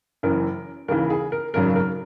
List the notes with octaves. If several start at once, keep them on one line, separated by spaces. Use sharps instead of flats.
F#1 F#2 E3 A#4
D#2 C#3 E3 A#4
G#4
A#4
G#1 F#2 C#3 F#3 A#4
A#4